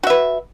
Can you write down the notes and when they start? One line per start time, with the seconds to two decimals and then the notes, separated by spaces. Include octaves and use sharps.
0.03 F#4
0.07 E5
0.10 B4